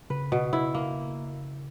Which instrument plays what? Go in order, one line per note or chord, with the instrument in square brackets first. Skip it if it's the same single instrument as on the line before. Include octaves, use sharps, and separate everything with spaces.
[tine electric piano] C#3 [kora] B4
[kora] B2
E4
A#3